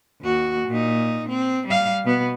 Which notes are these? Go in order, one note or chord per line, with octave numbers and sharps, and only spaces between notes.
D#2 F#4
A#2 D#4
C4
G3 F5
B2 B3